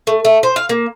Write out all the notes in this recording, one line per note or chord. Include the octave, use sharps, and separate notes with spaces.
A3
A3
C5
F5
A#3